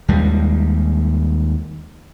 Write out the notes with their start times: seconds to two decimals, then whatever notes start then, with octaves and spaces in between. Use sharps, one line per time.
0.08 D#2 G3 G#3